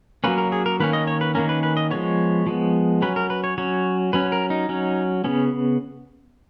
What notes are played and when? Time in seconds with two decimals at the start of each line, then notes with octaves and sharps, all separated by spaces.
0.24 F#3 A#3 C#4 B4
0.38 A#4
0.52 G#4
0.66 A#4
0.80 D#3 A#3 C#4 B4
0.93 D#5
1.07 C#5
1.21 B4
1.35 D#3 A#3 C#4 A#4
1.49 B4
1.63 B4
1.77 D#5
1.91 F3 G#3 B3 C#5
2.47 F3 G#3 B3
3.02 F#3 C#4 B4
3.16 A#4
3.30 B4
3.44 C#5
3.58 F#3 C#4 C#5
4.13 F#3 C#4 B4
4.32 A#4
4.50 D#4
4.69 F#3 C#4
5.24 C#3 F3 B3 C#4